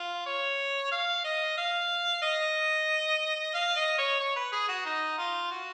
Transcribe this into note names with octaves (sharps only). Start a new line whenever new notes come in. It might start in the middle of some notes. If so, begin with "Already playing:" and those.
Already playing: F4
C#5
F5
D#5
F5
D#5
F5
D#5
C#5
C#5
B4
G#4
F#4
D#4
F4
F#4